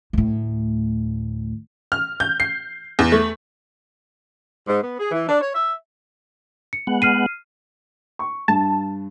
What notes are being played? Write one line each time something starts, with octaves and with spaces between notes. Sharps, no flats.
D2 A2
F6
G6
C7
E2
A3
G#2
B3
G#4
E3
D4
C#5
E5
C#7
G#3 B3 F#5
F6 C7 D#7
C#6
G2 A5